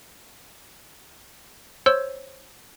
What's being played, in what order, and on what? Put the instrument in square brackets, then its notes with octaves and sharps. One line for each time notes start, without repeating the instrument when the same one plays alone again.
[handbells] C5 C#5 E6